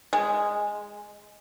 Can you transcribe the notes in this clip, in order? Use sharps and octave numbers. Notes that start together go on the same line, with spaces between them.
G#3